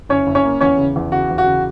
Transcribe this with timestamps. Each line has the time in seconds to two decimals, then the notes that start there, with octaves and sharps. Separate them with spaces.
0.09 F#1 C#4 C#5
0.27 F#1
0.35 C#4 C#5
0.44 A#3
0.61 E2 C#4 C#5
0.78 C#3
0.96 E2
1.12 C#3 F#4
1.30 E2
1.38 F#4
1.46 C#3